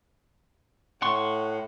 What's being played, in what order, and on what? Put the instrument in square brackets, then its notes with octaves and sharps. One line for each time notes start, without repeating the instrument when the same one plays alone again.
[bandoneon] A2 [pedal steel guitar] F#5 C6 C#6